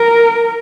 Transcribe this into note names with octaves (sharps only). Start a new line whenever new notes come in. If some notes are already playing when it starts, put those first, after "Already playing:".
Already playing: A#4